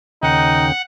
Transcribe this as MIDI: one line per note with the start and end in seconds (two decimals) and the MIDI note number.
0.23 0.72 39
0.23 0.72 49
0.23 0.66 63
0.23 0.81 78
0.23 0.72 79